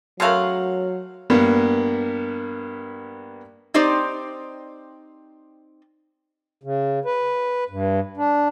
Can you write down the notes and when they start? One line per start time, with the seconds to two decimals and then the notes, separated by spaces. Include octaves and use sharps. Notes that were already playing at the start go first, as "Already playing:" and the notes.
0.20 C#3 F#3 A3 A#4 F5 F#5 C6
1.30 G2 A#3 B3
3.74 C4 D#4 G4 C5 D5
6.63 C#3
7.05 B4
7.70 G2
8.17 D4